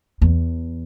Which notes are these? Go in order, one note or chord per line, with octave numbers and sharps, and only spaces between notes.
E2